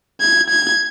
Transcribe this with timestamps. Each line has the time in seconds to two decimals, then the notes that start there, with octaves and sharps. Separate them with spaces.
0.21 G#6
0.50 G#6